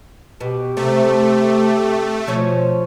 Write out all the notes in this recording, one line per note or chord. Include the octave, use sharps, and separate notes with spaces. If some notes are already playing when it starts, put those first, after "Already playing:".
B2 G4
C3 A3
B2 F3 C#4 C#5